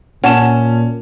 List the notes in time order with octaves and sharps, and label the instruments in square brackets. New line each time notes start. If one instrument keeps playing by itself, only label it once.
[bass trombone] A#2 [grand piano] C#4 A5 E7 [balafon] F#5